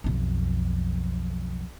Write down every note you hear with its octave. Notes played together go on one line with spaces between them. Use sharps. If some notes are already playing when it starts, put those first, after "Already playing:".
B1 F2